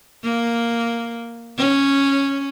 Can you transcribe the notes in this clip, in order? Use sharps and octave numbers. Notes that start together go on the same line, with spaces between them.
A#3
C#4